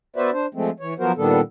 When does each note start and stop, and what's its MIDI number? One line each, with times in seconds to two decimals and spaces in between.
0.16 0.30 59
0.16 0.30 66
0.16 0.30 71
0.16 0.30 72
0.16 0.30 74
0.16 0.30 76
0.32 0.46 62
0.32 0.46 72
0.54 0.70 53
0.54 0.70 56
0.54 0.70 57
0.54 0.70 60
0.80 0.94 52
0.80 0.94 73
0.99 1.12 53
0.99 1.12 54
0.99 1.12 59
0.99 1.12 66
0.99 1.12 70
0.99 1.12 72
1.17 1.41 46
1.17 1.41 51
1.17 1.41 55
1.17 1.41 59
1.17 1.41 62
1.17 1.41 69